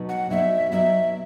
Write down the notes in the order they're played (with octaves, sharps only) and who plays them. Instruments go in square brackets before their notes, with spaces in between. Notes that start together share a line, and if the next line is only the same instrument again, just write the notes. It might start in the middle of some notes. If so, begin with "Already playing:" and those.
Already playing: [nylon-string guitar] B2 F#3 B3 D#4
[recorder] F#5
[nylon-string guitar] B2 F#3 B3 D#4 [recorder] E5
[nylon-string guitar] B2 F#3 B3 D#4 [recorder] E5